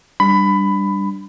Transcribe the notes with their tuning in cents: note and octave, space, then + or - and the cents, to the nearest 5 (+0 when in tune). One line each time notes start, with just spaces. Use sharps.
G3 +0 D4 +0 B5 +15